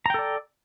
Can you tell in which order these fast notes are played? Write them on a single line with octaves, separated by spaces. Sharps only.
A#5 G5 A4 D5